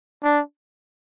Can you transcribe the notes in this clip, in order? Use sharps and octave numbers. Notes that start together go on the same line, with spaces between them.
D4